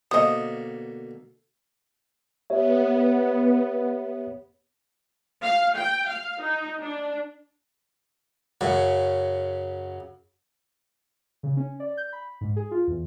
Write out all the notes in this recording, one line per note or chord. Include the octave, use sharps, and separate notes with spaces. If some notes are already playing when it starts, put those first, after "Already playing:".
B2 D3 A#3 C5 D#5 D#6
B3 G4 C#5 E5
F5
G5
F5
D#4
D4
F#2 C#3
C#3
C#4
D5
G6
B5
G#2
G#4
F4
E2